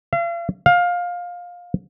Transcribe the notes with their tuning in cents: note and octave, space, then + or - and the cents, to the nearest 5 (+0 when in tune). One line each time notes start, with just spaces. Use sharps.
F5 -40
F5 +20